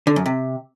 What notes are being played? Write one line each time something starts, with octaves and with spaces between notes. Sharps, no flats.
D3
F#2
C3